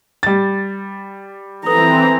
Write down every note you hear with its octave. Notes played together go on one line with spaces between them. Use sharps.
G3 A6
E3 C4 A4 B4 A#5 D#6